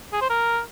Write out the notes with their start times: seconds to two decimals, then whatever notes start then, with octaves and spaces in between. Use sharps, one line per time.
0.13 G#4
0.21 C5
0.30 A#4